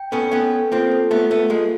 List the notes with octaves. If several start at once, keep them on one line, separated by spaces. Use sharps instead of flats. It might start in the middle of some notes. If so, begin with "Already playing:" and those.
Already playing: G5
B3 C#4 A4
B3 C#4 G5
A4
A#3 C4 F4
A4
A3 B3 F4
A3 B3 A4
G#3 A#3 F4